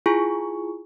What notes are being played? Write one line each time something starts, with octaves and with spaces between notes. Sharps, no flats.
E4 F4 G#4 G#5 C#6